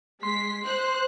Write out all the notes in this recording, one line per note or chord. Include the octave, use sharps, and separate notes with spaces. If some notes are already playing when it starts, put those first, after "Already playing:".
G#3 C6 B6
C5 F#6